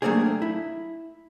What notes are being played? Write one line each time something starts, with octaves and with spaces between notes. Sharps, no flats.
F#3 A3 A#3 C4 D4 G#4
E4